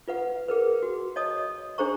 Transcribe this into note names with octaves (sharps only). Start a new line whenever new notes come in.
F4 B4 F#5
G#4 A#4 B4
F#4
C#5 D#5 A5 D#6
D4 G#4 C5 A#5 C#6